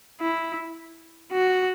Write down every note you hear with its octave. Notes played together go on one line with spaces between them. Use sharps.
E4
F#4